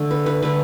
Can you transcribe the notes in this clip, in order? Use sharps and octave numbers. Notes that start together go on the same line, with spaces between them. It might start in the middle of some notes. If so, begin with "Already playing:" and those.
Already playing: D3 A3 A4
B4
B4
D3 A3 B4